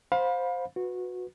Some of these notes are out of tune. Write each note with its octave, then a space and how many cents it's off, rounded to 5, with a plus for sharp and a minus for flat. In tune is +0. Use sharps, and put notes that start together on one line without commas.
C5 +0 F5 +30 B5 -15
F#4 -20 B4 +0